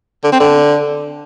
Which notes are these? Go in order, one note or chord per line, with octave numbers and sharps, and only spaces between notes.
D3
C4
D3